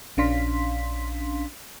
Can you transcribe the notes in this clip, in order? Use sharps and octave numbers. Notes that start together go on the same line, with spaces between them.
A#1 C#4 D4 F5 C6 B6